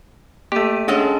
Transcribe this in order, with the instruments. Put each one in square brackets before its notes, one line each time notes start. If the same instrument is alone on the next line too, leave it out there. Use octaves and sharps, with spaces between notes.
[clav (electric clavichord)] A3 G4 [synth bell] A#3 D#7
[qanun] G#3 A4 D#5 [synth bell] C#4 D4 C#5